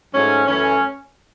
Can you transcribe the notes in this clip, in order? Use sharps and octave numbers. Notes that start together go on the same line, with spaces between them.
G#2 F#3 A3 C#4
F#2 E3 A3 C#4